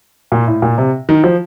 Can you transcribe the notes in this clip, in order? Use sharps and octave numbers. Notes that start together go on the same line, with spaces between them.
A#2
A2
A#2
C3
D#3
F3